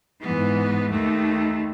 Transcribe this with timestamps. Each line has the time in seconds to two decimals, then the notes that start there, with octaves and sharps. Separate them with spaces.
0.21 G#2 E3 B3
0.90 D#2 D#3 A3